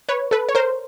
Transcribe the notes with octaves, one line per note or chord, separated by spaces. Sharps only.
B4 C#5
A4 B4
C#5
A#4 C5